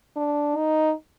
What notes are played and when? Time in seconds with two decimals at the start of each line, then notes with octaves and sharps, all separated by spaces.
0.17 D4
0.57 D#4